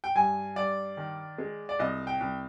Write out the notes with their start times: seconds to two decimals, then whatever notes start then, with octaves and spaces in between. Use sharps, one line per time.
0.04 G5
0.15 G2 G#5
0.56 G2 D5
0.97 D#3
1.38 G#3
1.69 D5
1.79 C2 D#5
2.07 G5
2.21 C2